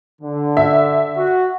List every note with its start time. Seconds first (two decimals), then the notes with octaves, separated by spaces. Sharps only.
0.22 D3
0.57 E5
1.17 F#4